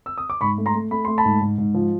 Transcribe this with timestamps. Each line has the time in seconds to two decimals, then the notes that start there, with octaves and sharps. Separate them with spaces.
0.06 E6
0.18 D#6
0.30 D6
0.41 G#2 B5 C#6
0.58 A3
0.66 A#5 C6
0.75 A3
0.91 A3 B5
1.05 A3 C6
1.18 A5 B5
1.25 G#2
1.41 G#2
1.58 G#2
1.74 F3